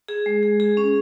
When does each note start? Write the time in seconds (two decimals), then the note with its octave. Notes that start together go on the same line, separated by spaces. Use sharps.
0.09 G#4
0.26 G#3
0.43 G#4
0.60 G#4
0.77 C#4